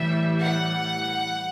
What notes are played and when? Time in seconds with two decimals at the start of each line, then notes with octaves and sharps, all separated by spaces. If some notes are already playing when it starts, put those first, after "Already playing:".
Already playing: A2 E3 G3 E5
0.41 F#5